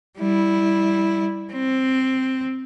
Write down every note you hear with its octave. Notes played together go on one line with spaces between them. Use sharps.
G3 E4
C4